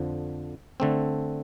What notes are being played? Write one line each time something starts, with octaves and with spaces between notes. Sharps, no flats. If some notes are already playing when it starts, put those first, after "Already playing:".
Already playing: F2 D3 F3
D3 A3 C4